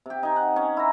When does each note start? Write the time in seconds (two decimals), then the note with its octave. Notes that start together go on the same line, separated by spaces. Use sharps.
0.06 C3 G4
0.23 D#4 G#5
0.36 F#5
0.56 C#4
0.77 E4 A#5